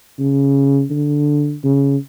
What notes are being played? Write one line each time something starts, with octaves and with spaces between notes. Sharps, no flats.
C#3
D3
C#3